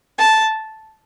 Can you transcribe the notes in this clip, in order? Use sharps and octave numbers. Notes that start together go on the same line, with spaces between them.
A5